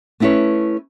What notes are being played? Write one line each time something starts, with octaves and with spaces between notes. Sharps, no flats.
A3 C#4 E4 B4 C#5